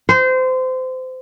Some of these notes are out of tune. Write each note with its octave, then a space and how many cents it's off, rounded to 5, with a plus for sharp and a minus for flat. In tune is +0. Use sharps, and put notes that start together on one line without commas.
C5 -25